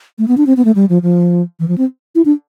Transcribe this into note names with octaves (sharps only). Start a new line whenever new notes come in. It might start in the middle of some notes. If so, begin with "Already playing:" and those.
A3
B3
D4
C4
B3
A3
G3
F3
F3
E3
F3
C4
E4
D4